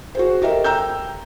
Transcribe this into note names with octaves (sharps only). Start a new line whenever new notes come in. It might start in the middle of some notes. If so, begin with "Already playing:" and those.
F#4 G#4 C5
G4 A4 A#4 D#5 E5
G5 A#5 E6 G6